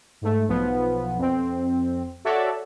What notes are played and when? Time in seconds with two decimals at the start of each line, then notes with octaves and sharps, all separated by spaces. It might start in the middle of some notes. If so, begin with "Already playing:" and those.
0.21 G#2 A3
0.48 B1 F3 B3
1.18 F2 C4
2.25 F#4 A4 C#5 D5 E5